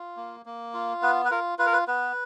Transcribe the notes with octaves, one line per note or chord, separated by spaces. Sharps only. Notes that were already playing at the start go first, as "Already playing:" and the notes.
Already playing: F4
A#3
A#3
F4
B3 B4
B4
F4 A#4
F4 B4
A#4
B4
B3 B4